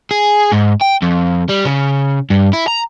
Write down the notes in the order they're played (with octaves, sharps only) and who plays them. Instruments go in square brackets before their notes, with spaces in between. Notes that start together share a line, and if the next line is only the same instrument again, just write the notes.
[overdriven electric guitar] G#4
G#2
G5
F2
G3
C#3
G2
E4
A#5